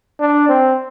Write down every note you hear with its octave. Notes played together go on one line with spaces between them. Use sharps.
D4
C4